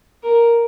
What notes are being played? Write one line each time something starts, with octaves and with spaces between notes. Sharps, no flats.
A#4